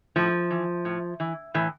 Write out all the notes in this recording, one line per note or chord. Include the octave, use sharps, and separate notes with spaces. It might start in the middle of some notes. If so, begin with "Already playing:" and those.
A2 F3
E3
A2
E3
A2 E3